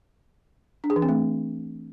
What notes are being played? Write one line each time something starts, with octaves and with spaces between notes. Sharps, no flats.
D4
G#4
E3
C4
A3